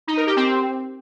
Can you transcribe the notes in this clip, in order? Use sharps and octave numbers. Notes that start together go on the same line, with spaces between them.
D#4
A#4
G4
C4